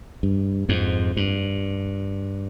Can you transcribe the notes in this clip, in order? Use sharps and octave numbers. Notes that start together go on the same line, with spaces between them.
G2
F2 G#2
G2